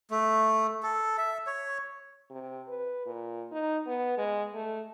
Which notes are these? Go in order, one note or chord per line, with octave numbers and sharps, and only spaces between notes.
A3
A4
E5
C#5
C3
B4
A#2
D#4
B3
G#3
A3